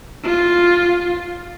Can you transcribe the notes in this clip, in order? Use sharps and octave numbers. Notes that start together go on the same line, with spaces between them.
F4